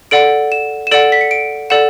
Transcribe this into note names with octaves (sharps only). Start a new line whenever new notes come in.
A4 D5 F#5 D7
E7
E7
A4 D5 F#5 D7
B6
C#7
D7
A4 D5 F#5 E7